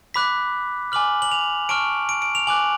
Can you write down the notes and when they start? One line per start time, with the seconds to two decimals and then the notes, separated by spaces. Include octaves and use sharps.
0.14 B5 D6 F#6 B6
0.92 G#5 D6 F6 F#7
1.22 F#7
1.32 F7
1.69 A5 C#6 F6 D7
2.09 D7
2.22 D7
2.35 F7
2.47 G#5 D6 F#6 F#7